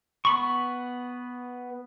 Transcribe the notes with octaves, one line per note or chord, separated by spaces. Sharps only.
B3 B5 C#6